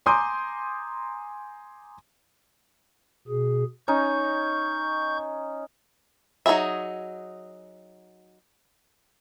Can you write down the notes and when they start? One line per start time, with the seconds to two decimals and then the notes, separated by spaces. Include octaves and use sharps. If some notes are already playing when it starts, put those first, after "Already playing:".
0.06 G#5 A#5 C6 D6 D#6 G6
3.28 B2 G#4
3.88 C#4 D#4 C#6 G6
6.46 F#3 D#4 F4 G#4 E5